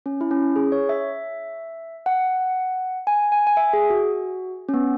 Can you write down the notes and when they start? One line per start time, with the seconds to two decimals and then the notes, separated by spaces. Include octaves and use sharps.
0.06 C#4
0.21 E4
0.31 C#4
0.56 G#4
0.72 C#5
0.89 E5
2.06 F#5
3.07 G#5
3.32 G#5
3.47 G#5
3.57 E5
3.73 G#4
3.90 F#4
4.69 C#4
4.74 B3